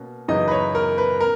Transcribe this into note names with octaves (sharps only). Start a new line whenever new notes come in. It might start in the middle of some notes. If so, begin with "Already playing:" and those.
Already playing: B2 A#3 C#4
F#2 C#3 E3 B3 D#4 D#5
B4
C#5
A#4
B4
A#4